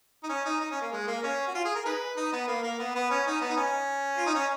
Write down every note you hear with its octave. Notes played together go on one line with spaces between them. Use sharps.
D#4
C#4
D#4
D#4
C#4
A#3
G#3
A#3
C#4
F#4
F4
G#4
A#4
D#4 G#4 B4
D#4
B3
A#3
A#3
B3
B3
C#4
D#4
B3
D#4
C#4
F4
D#4
C#4